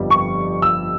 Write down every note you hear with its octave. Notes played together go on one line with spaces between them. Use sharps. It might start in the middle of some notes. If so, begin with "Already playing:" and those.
Already playing: G1 F2 G3
C#6
E6